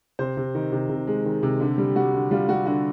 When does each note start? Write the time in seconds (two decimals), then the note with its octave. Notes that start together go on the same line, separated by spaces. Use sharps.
0.19 C3 C5
0.37 C3
0.55 D#3
0.72 C3
0.89 C3
1.07 G#3
1.25 D#3
1.43 C3
1.60 D3 G4
1.78 G3
1.96 G3 F#4
2.13 D3
2.31 G3 F4
2.48 G3 F#4
2.66 D3 F#4